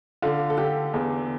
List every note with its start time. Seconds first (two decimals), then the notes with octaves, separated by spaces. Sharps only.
0.22 D3 F4
0.50 A4
0.57 D3 G4
0.94 E2